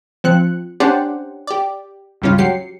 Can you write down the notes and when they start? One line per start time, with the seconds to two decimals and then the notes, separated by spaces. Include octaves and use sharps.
0.24 F3 C4 F#6 C#7
0.80 C#4 D4 G4 C5 D5 F#5
1.47 G4 D5
2.22 C#2 G2 G3 C#4 F4
2.38 F#3 G4 C7 C#7